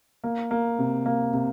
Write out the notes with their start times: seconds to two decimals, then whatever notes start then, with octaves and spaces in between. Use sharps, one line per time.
0.24 A#3
0.51 A#3
0.79 C3
1.06 A#3
1.33 C3